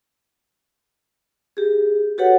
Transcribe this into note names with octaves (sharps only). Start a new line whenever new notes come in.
G4 G#4
F#4 G4 A4 B4 C#5 F#5